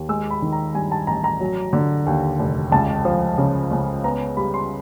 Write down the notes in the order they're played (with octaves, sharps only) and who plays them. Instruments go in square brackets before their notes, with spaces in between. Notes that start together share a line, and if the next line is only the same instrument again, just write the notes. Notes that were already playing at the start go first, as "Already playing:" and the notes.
Already playing: [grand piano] D#2
G#3 E6
B5
D#3
A#5
G2 G#5
A5
A1 A#5
A#5
F#3
D3
D#2
F1
C#2 A5
F3
C#3
C#2
B3 A#5
G3 B5
C6